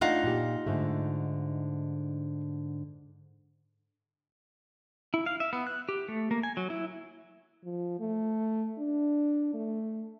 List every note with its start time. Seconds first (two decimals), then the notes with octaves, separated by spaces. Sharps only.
0.01 A3 D4 D#4 F4 F#5
0.24 A#2 G4
0.66 G#2 D3 A3
5.14 E4
5.26 F5
5.40 E5
5.53 B3
5.67 F#6
5.89 G4
6.08 A3
6.31 A#3
6.43 G#5
6.57 F#3
6.70 E4
7.64 F3
8.00 A3
8.79 D4
9.54 A3